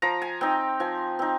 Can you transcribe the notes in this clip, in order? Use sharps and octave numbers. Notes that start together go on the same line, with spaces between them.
F3 A#5
G#5
C4 D#4 G5
F3 G#5
C4 D#4